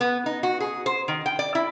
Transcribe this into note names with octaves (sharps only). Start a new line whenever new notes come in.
B3
D#4
F#4
G#4
C5
D#3
G5
D5
E4